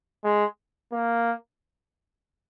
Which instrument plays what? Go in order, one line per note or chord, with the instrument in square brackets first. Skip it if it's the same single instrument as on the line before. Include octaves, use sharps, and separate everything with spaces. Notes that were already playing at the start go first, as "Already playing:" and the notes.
[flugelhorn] G#3
A#3